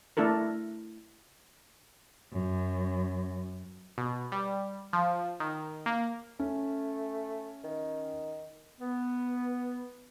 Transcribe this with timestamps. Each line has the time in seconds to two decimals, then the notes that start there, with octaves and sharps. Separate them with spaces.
0.17 A3 D4 E4 A4 A#4
2.34 F#2
3.98 B2
4.32 G3
4.93 F3
5.40 D#3
5.86 A#3
6.39 A3 C#4
7.64 D#3
8.80 B3